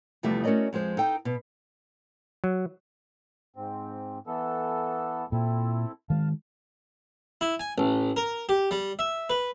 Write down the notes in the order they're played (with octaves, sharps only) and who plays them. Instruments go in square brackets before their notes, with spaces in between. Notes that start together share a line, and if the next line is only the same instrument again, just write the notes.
[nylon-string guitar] E2 C3 F3 G3 A3 E5
A3 C#4 F#4 A#4 D5 D#5
F2 F3 G#3 C5
D#4 A4 G5
B2
[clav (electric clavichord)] F#3
[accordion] G#2 C4
E3 B3 A4
[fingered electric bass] A#2 [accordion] C4 E4 A4
[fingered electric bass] D#3 G#3 [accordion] F5 A5
[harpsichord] E4
G#5
A1
A#4
G4
G3
E5
B4